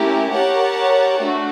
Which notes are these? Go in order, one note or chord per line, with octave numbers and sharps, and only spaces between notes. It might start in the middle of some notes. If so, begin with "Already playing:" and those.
Already playing: A3 C#4 E4 G4 A#4
G4 A#4 C#5 F#5 A5
A3 D4 F#4